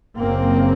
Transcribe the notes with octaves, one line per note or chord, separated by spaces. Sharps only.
F#1 F#2 C#3 A#3 C4